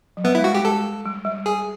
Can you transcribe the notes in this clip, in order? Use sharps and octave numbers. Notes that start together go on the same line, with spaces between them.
F#3
G3 B3
E4
G#3
F#4
G#3 G4
G#3 A4
G3
G3
G#4